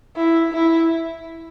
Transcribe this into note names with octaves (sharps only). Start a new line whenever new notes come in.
E4
E4